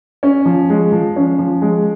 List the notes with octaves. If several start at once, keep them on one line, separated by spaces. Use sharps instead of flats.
C#4
F3
G#3
F3
C#4
F3
G#3